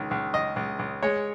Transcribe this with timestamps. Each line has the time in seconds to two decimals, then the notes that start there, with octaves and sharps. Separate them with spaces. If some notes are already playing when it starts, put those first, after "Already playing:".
Already playing: C#2 D#3
0.11 C#2
0.34 C#2 D#5
0.56 C#2
0.79 C#2
1.03 G#3 C#5